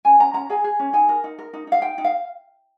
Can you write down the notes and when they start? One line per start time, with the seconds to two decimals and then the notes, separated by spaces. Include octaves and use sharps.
0.05 C#4 G#5
0.19 C#4 A#5
0.34 C#4 A#5
0.50 G#4 G#5
0.64 G#4
0.79 C#4
0.93 D#4 G#5
1.09 A#4
1.24 D#4
1.39 A#4
1.53 D#4
1.67 D#4 F5
1.82 D#4 G5
1.98 D#4
2.04 F5